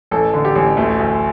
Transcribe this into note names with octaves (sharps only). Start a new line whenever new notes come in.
A1 A4
D3
G4
A1
D2 A3
D2